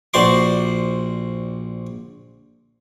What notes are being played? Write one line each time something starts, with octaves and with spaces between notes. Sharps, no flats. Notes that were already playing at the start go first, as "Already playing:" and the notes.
A#1 F#4 C5 D5 C6 D6